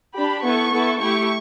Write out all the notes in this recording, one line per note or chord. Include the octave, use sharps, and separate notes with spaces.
D4 G4 B5
B3 E4 A4 C#6
B3 E4 A4
A3 E4 G4 C#6